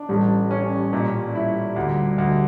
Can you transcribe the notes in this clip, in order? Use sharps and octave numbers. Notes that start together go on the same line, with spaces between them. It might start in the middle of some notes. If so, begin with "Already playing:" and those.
Already playing: D4
A1 G3
C#4
A#2
E4
D2
D2